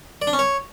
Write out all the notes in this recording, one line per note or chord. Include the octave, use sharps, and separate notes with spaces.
D5
D4
C#4
C#5